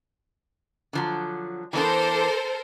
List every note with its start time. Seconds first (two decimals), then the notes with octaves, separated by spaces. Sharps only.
0.93 D3 F3 F#3
1.73 E3 B3 D4 A4 A#4 C5